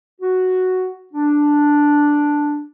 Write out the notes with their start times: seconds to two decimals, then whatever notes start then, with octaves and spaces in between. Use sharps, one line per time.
0.21 F#4
1.14 D4